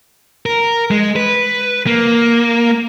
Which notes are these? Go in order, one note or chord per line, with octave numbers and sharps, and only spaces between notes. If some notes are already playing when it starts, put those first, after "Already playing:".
A#4
G#3
B4
A#3